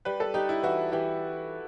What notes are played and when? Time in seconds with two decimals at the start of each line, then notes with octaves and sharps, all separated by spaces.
0.05 G3 B4
0.20 A4
0.34 D#4 G4
0.49 E4
0.63 E3 F#4
0.92 E3 G4